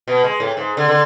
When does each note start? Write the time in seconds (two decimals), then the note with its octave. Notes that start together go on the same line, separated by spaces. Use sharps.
0.08 B2
0.23 G#3
0.40 A2
0.57 G#2
0.77 D3
0.88 D3